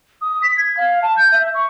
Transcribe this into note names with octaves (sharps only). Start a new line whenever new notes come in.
D#6
B6
G#6
F5
A5
G6
E5
C#6